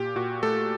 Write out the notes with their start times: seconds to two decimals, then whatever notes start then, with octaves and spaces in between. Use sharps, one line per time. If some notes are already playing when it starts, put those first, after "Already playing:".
Already playing: A#2 G4
0.16 A#2 F#4
0.43 A3 A4